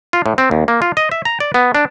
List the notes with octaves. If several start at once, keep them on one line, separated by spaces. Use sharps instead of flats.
F4
A2
C4
D#2
A#3
F4
D#5
E5
A#5
D5
B3
D4